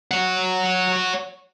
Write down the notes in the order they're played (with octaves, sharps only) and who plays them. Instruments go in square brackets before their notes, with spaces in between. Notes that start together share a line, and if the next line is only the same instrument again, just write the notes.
[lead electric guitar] C#5 F#5